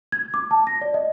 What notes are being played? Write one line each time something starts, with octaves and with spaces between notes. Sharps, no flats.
G#6
D6
A5
A#6
D5
D#5